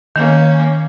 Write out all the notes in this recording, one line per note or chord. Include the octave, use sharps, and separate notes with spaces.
D#3 A#3 C#4